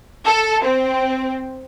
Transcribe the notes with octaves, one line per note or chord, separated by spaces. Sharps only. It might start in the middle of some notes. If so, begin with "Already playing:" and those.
A4
C4